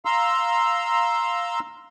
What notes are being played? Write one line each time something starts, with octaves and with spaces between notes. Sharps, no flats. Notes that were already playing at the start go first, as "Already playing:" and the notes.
F5 A#5 C6 E6